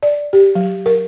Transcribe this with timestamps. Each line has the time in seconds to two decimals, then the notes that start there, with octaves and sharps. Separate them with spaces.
0.03 D5
0.33 G4
0.55 F#3
0.86 A#4